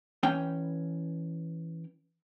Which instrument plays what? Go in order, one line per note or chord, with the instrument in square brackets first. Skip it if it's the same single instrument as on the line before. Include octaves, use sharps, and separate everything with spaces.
[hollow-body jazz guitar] E3 C#4 G5